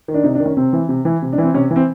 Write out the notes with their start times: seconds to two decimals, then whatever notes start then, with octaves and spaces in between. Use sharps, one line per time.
0.08 D#3
0.14 D4
0.24 C3 D#4
0.35 D4
0.40 D#3
0.45 C#4
0.57 C3 C4
0.73 E3
0.89 C3
1.05 E3
1.22 C3
1.33 D4
1.38 E3
1.43 C4
1.54 C3 C#4
1.71 E3
1.76 C4